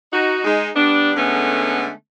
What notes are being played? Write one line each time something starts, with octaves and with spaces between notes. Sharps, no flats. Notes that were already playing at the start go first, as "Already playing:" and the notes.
D#4 F#4
G#3 D#4
G3 B3 D4
D3 G#3 A3 B3 C#4